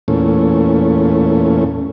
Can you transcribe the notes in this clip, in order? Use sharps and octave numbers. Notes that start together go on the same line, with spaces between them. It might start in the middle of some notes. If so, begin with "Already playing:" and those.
E2 A#2 A3 C#4